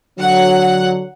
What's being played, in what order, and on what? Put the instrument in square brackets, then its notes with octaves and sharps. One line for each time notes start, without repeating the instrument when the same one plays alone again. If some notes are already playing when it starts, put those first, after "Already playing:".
[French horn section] D3 F#3 [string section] F#5